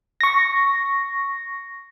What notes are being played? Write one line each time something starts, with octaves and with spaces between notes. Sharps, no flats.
C#6 A#6